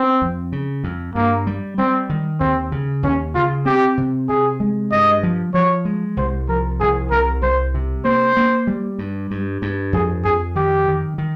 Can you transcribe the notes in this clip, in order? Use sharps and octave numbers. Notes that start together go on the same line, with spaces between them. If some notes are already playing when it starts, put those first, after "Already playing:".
Already playing: C4
F2
C#3
F2
G2 A#3
G3
G3 C4
D#3
D#2 C4
C#3
D#2 C#4
C#3 F4
C4 G4
C3
C3 G#4
G#3
G2 D#5
F3
F3 C#5
G#3
C2 C5
F3 A#4
C2 G#4
C2 A#4
C2 C5
C3
A#3 C5
A#3
G3
G2
G2
G2
F2 G#4
F2 G#4
D#3 G4
D#3
D#3